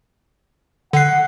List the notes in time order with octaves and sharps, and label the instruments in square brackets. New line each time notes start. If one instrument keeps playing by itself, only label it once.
[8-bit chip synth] D3 C7 [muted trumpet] F#5